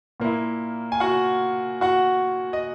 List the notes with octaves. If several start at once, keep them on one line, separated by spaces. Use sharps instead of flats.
A#2 A#3 E4
G#5
F#4 F#5
F#4 F#5
D#5